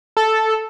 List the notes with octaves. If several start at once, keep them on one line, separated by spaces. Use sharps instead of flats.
A4